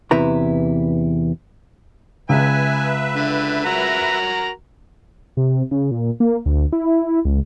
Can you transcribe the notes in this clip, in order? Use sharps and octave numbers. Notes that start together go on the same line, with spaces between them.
E2 C3 E4 B4 A#5
C#2 B4 E5 G#5
D3
F#4 A#4 A#5
C3
C#3
A#2
A#3
D2
E4
C#2